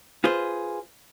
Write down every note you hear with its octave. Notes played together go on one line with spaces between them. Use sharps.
F4 G#4 B4 C5